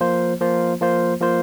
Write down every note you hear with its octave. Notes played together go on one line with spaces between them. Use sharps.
F3 A#3 F4 C5
F3 A#3 F4 C5
F3 A#3 F4 C5
F3 A#3 F4 C5